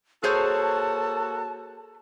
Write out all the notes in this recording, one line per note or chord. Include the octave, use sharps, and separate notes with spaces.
A#3 F#4 G#4 A4 C5 C#5 A5